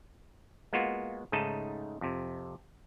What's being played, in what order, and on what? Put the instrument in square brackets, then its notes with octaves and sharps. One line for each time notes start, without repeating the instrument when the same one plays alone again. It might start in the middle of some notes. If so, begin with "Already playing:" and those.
[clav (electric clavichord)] G#3 A#3 B3 F4 F#4
G#2 C#3 A3 D#4 D#5 A5
F2 C3